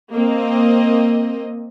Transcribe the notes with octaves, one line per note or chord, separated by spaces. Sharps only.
A#3 C4 D#5